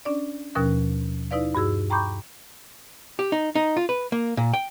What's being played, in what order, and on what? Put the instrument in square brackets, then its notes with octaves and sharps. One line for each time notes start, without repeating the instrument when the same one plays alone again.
[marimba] C#4 D4 D5
D#2 B2 F3 C#4 A#4 F#6
D#4 E4 B4 D5 F5
G2 F#4 G#4 E6
G5 A#5 B5 C#6 D6 G6
[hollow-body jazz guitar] G4
D#4
D#4
F4
B4
A#3
A#2
G5